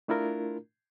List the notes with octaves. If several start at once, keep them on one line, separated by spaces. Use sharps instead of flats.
A3 D4 E4 F4 A#4